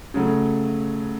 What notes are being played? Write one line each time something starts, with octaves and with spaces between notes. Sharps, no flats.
C#3 F#3 A3